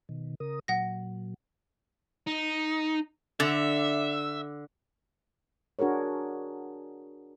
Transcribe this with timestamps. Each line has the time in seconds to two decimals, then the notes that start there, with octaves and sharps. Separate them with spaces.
0.09 B2 D#3
0.40 C#3 A#4 D#6
0.68 A#2 F#3 F#5 A#6
2.27 D#4
3.40 D3 E5
5.79 D4 F#4 G#4 A#4 C#5